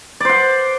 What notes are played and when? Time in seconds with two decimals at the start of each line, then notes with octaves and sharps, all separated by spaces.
0.20 D5
0.25 C5
0.29 F#5